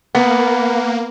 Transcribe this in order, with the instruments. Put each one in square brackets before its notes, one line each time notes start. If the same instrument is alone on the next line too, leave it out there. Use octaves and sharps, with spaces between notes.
[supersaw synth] A#3 [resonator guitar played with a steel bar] B3